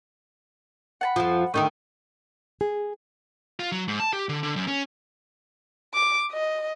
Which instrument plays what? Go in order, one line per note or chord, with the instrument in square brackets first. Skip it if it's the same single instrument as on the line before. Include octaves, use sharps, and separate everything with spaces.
[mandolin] F#5 A5 B5
[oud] F2 F3
[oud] D2 D#3 D#4 [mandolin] A3 D#5 G5
[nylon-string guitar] G#4
[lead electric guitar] F4
F#3
G#2
A5
G4
D3
D3
F#2
C#4
[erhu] D6
D#5